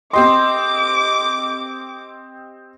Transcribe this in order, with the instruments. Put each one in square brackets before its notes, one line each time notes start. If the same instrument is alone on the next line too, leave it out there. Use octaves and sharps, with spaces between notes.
[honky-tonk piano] C4 G4 D#5 [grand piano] C6 [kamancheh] D6